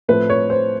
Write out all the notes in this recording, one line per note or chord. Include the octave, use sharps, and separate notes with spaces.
A2 F3 A3 C4 B4
C#5
C5